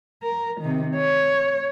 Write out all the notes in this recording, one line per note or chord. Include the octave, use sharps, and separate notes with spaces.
A#4
C3 D#3
C#5